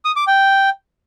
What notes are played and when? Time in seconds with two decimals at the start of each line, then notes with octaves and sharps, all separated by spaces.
0.05 D#6
0.16 D6
0.27 G5